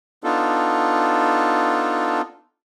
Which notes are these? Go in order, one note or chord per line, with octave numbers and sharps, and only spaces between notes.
B3 D4 D#4 F4 A4